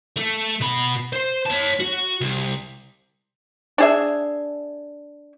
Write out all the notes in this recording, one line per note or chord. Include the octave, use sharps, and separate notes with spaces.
A3
B2 B5
C5
C#5 A5
F#4
C2
D4 G#4 E5